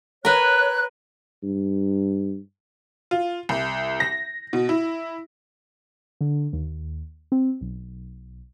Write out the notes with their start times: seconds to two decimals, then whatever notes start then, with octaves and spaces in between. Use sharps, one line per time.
0.25 A#4 B4 C#5 F#6
1.43 G2
3.11 F4
3.49 C2
4.00 A#6
4.53 B2
4.69 E4
6.21 D3
6.53 D#2
7.32 C4
7.61 B1